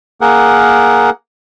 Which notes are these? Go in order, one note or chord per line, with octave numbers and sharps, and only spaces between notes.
A#3 G#4 A#4 F#5